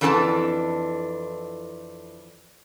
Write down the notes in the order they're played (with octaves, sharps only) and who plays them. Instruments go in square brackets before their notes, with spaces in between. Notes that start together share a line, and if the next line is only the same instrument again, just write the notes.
[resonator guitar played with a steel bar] F2 E3 D4 A4 G#5 A5